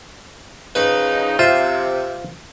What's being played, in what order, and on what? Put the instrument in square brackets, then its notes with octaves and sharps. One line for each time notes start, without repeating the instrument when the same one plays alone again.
[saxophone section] C#3 F3 D#4 [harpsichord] B4
[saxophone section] C3 [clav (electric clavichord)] F4 C5 [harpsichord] E5